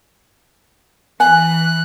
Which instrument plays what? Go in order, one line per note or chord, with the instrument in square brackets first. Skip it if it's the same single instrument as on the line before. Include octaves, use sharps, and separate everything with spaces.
[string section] E3 [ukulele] G#5 [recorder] F#6